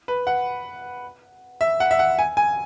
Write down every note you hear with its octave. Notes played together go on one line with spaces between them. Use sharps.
B4
F#5
E5
F#5
E5
F#5
G#5
G#5